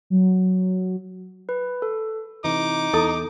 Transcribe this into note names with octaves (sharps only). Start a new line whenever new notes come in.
F#3
B4
A4
C3 E3 D#4 D6
E2 E4 A4 D#6